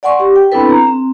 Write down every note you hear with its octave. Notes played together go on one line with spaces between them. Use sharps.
D5 F#5 G#5 C6 C#6
G4
G5
B3 C4 D4 E4 A4 B4
A#5
C4